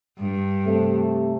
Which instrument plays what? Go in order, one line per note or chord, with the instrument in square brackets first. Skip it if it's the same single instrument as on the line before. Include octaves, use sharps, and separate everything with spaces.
[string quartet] G2
[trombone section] C3 A3